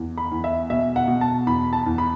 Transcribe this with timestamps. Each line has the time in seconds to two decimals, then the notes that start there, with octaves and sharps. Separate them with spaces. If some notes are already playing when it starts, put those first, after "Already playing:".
Already playing: E2
0.18 B5
0.31 E2
0.44 E5
0.70 B2 E5
0.96 F#5
1.08 B2
1.21 A5
1.46 E2 B5
1.73 A5
1.86 E2
1.98 B5